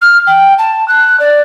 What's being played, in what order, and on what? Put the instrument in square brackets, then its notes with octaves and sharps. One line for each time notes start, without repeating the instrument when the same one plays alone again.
[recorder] F6
G5
A5
F#6
D5